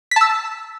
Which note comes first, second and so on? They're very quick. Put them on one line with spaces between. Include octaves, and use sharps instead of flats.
B6 A5 E6